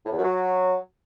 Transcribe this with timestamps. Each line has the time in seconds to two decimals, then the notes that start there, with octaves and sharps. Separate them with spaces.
0.06 A2
0.12 E2
0.18 F#2
0.24 F#3